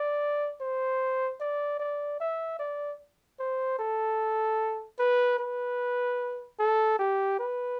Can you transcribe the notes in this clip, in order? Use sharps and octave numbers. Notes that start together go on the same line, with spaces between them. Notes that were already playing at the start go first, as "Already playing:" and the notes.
Already playing: D5
C5
D5
D5
E5
D5
C5
A4
B4
B4
A4
G4
B4